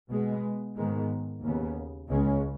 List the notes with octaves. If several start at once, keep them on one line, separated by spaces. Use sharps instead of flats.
B2 G#3 B3
G#2 D#3 G#3 B3
D#2 C#3 B3
C#2 C#3 G#3 C#4